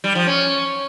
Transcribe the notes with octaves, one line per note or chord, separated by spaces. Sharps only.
G3
F3
C#4